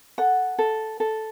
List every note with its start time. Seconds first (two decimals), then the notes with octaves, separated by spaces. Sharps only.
0.18 A4 F#5
0.59 A4
1.00 A4